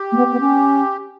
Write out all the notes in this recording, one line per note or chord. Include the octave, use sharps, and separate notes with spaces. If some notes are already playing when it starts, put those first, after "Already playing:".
Already playing: G4
A#3
B3
B3
C#4